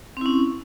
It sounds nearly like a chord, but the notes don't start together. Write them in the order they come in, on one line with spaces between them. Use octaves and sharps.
C4 E4 C#4